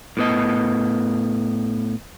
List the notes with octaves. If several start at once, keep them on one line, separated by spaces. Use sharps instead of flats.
A2 B3 D#5